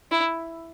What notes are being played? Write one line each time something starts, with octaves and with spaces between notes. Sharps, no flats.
E4